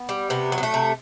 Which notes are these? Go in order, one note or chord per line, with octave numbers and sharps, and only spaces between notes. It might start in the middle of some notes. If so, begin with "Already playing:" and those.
Already playing: B3
G3
C3 B3
F#3
B3
A3
C3